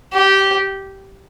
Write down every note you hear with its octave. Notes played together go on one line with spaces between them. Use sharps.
G4